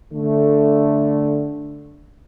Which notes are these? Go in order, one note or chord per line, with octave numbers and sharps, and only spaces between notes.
D3 A3